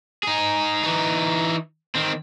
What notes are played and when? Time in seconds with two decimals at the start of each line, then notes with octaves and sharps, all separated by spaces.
0.23 D#4 G#4
0.83 E3 D#4
1.95 D#3 C4